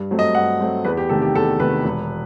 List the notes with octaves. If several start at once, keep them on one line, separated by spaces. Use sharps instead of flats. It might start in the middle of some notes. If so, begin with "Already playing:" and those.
Already playing: G2
F#3 A3 C4
D#5
G2 F#5
F#3 A3 C4
E2 B4
G4
C3 D#3 A3 A4
G4
E2 A4
C3 D#3 A3 B4
E1